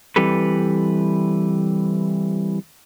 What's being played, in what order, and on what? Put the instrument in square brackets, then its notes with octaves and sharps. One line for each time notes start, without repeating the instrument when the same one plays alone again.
[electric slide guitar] E3 G3 C4 G4 A4 B4